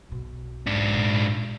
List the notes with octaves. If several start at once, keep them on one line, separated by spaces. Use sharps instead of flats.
B1 B2
G#2 D4
A#2 F4